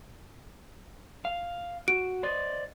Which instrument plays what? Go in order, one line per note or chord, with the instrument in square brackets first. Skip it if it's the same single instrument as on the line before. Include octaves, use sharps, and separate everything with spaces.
[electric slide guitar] F5
[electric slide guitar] F#4 [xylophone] D7
[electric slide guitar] C5 D5 D#5